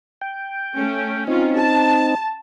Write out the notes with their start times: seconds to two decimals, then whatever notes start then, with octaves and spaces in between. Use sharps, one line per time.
0.21 G5
0.75 A3 C#4
1.27 C4 C#4 D#4 F4
1.57 A5